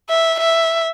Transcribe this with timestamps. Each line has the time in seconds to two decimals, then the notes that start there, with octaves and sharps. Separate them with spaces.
0.09 E5
0.40 E5